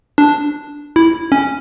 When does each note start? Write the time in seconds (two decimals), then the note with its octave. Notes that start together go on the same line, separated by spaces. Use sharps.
0.18 D4
0.96 E4
1.32 C#4